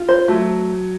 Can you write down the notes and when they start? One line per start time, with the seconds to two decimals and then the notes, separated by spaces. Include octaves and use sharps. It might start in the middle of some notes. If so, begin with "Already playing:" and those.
Already playing: F4
0.08 C5
0.28 F#3 A3